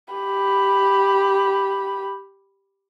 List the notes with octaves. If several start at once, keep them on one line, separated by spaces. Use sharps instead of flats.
G4 B5